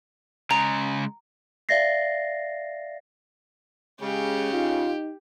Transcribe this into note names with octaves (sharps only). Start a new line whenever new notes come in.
C#3 G#3 A#5
D5 E5 F5 A6 A#6 C7
C#3 G#3 G4
D#4 F4